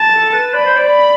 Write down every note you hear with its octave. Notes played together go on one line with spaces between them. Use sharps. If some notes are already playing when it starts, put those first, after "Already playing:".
Already playing: A5
A4
B4
D5 B5
C5
D5
B5